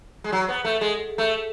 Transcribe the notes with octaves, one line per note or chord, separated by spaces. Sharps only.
G#3
F#3
B3
A3
G#3
A3